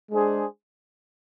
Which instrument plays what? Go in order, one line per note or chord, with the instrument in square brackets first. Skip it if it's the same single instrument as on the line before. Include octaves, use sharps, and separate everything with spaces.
[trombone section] G#3 D4 G#4 C5